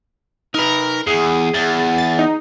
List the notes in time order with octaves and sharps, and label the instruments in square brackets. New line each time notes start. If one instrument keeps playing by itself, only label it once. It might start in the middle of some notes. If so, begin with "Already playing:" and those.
[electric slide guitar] D#4 B4 [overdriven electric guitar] A#4 A#5
[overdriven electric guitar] E2 [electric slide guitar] G#4
[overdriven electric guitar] E2 [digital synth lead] A6
[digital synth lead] A6
D#4